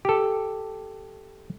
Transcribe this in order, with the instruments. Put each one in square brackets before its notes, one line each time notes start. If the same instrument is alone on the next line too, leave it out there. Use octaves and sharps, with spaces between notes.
[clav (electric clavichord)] G4 A4